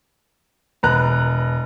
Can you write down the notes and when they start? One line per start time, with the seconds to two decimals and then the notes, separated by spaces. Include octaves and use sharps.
0.83 E1 B4 A#5 F#6